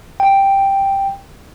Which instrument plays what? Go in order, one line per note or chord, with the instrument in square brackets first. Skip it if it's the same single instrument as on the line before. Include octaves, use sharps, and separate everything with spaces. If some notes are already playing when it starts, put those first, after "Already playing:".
[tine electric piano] G5